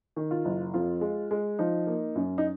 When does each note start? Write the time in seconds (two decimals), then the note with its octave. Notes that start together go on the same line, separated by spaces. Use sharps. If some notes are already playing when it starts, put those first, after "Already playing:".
0.16 D#3
0.31 F4
0.45 F#1
0.74 F2 F4
1.01 G#3
1.31 G#3
1.59 F3 D#4
1.87 A#3
2.15 F#2
2.38 D#4